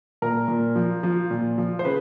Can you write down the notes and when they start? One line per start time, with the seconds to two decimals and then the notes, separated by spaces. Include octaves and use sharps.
0.22 A#2 A#4
0.48 A#2
0.76 F3
1.03 F3
1.31 A#2
1.58 F3
1.79 C5
1.85 C#3 B4